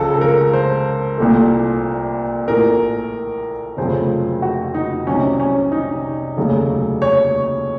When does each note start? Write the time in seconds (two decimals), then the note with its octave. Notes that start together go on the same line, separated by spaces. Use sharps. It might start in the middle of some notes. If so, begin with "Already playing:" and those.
Already playing: C#2 C#3 F3 A4
0.14 A4
0.21 A#4
0.53 C5
1.18 C2 A#2 A3
2.48 A#1 A2 A3 A#4
3.77 F1 F2 C#3 F#3 A3 C5
4.42 F#4
4.74 D#4
5.07 C2 C3 F#3 C#4
5.40 C#4
5.72 D#4
6.37 F1 D#2 C#3 F#3 A3
7.02 C#5